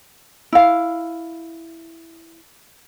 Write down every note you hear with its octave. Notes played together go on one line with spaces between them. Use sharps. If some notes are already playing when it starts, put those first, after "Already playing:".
E4 F5